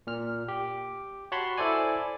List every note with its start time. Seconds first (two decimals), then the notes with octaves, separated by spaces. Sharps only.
0.07 A#2 F6
0.48 G4
1.32 F#4 C#5 F#5 A5 B5 C6
1.58 E4 A4 C5 D5 G#5